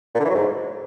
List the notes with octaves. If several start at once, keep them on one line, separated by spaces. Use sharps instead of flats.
A#2
D3
E3
F#3
G#2